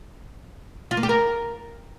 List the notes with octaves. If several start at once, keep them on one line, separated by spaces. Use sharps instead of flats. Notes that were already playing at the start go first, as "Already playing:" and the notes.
F4
A#3
G4
A#4